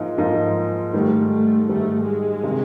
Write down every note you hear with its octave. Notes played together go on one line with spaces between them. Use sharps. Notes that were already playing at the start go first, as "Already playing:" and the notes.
Already playing: G#2 F3 A#3 D#4
G#2 F3 A#3 D#4
G#2 D#3 G3 A3
A3
G#2 D#3 G3 A3
G#3
C3 D#3